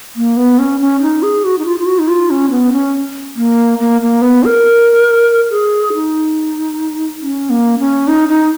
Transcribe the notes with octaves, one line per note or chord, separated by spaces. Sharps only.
A#3
B3
C#4
C#4
D#4
G#4
F#4
D#4
F4
F4
F#4
D#4
F4
C#4
B3
C#4
A#3
A#3
A#3
B3
A#4
G#4
D#4
C#4
A#3
C#4
D#4
D#4